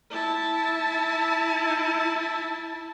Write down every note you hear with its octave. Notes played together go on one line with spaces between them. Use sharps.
E4 A5